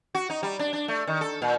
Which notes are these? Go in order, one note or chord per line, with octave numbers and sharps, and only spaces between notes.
F#4
D#4
G3
D4
D4
A3
D#3
A4
A#2